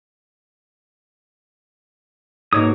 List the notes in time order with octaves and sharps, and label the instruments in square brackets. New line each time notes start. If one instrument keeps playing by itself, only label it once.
[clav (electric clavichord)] G#2 B2 [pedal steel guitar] A#3 C#5 D#6